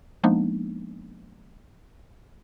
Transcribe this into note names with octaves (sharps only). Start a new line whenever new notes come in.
F3 G#3 A#3 B3 D4 D#4